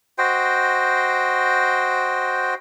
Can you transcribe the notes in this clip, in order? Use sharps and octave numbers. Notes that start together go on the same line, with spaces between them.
F#4 C5 D#5 G5